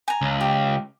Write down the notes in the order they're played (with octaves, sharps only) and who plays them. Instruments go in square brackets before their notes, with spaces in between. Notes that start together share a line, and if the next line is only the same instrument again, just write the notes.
[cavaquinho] G#5 A#5
[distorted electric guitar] C#2
[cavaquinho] G4